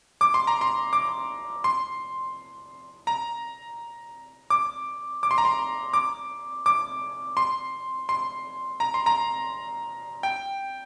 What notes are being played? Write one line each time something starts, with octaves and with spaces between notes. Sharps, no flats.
D6
C6
A#5
C6
D6
C6
A#5
D6
D6
C6
A#5
C6
D6
D6
C6
C6
A#5
C6
A#5
G5